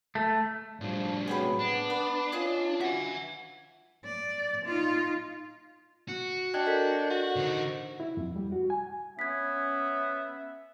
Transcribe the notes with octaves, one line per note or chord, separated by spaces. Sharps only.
A3
A2 F3 G3 D4
C3 F#3 B3 G#4 G5 B5
B3 D4
B4
C#4 F4 D#5 G#5
F#4 E5 G#5
D5
D#4 F4
F#4
D4 D#5 G5 F#6 G#6
A4 A#4 D#5 G6 B6
F#4
D3 D#4 C5
E4
F2
G3
F#4
G#5
B3 C#4 E5 G#6 B6